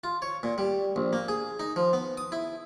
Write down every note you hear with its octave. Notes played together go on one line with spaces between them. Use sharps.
F4
C#5
A#2
G3
A#1
A#3
G#4
D#4
F3
B3
D#6
E4